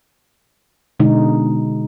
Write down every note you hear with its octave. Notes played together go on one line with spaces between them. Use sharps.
B2 D3 G#3 D#4